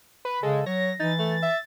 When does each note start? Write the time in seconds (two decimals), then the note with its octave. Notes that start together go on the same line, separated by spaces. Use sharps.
0.25 B4
0.43 C#3 G#3 A4
0.66 F#3 C#5 A#6
1.00 E3 D#4 A6
1.19 A3
1.42 E5